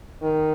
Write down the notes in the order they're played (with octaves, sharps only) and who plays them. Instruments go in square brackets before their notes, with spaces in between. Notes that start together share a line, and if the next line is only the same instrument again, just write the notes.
[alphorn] D#3